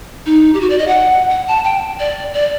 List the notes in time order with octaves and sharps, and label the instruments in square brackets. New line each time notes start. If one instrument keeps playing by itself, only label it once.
[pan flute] D#4
G4
F#4
D5
D#5
F#5
F#5
A5
G5
D5
D5